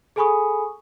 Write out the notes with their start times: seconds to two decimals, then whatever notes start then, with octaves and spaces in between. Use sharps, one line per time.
0.16 G#4 A4 G#5 B5 C#6 D#6